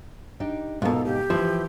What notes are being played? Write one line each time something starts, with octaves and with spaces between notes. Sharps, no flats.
D4 D#4 G4
G#2 B2 F4 A4 A#4
C#3 G4
E3 F3 E4